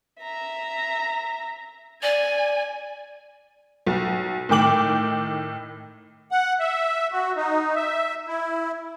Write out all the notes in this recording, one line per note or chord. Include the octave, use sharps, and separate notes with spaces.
E5 A#5
D5 G#5
B1
A2 D#3 G5 D6 F#7
F#5
E5
F#4
D#4
E5
E4